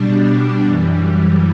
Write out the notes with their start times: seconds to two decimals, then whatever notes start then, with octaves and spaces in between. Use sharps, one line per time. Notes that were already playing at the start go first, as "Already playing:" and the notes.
Already playing: B2 G3 D4
0.65 F#2 E3 G3